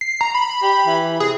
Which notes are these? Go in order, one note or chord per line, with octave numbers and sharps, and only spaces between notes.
C7
A#5
B5
G4
E3
C3 G#4